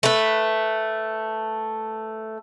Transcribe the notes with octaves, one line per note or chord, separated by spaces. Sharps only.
A3 B4